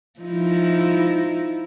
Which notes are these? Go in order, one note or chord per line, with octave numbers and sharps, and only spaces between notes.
F3 D#4 E4